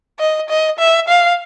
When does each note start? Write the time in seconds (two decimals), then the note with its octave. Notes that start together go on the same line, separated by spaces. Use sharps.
0.19 D#5
0.49 D#5
0.79 E5
1.08 F5